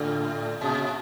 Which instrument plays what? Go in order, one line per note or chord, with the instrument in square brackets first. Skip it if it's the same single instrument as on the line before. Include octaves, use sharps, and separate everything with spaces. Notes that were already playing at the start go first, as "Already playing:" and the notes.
Already playing: [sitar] A2 [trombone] D3
[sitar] A#2 [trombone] C#3